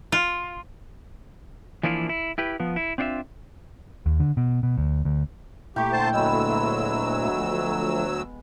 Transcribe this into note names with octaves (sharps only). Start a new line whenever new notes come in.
F4
E3 F3 A#3 D4 E4 F4
E4
E4 G4 B4
F3 B3
E4
C4 D4 F4 C#5 E5
D#2
D3
B2
B2
D2
D2
A#2 A3 E4 G4 G5 A#5 C#6
D3 C5 A5
D2 F#3 G#3 B3 B4 E6
F3 A3